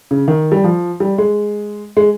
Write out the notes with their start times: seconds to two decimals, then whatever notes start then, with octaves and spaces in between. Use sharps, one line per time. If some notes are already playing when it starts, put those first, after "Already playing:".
0.11 C#3
0.28 D#3
0.52 G3
0.64 F3
1.00 G3
1.18 G#3
1.97 G#3